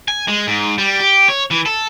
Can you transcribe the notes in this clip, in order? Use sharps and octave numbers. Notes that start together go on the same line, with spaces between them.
G#5
G#3
G#2
G3
G4
C#5
E3
A4